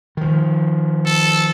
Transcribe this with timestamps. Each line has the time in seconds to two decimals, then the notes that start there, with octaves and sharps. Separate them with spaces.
0.17 D#3 F3
1.06 A4